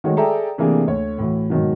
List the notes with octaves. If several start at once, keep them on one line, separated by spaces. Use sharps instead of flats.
D#3 G#3 A3 D#4 F#4 C#5
G#4 A4 D5 E5 G5 A#5
C3 E3 A3 A#3 D4 G#4
D2 C#5
A2 E3 F#4
G#2 B2 D#3 F#3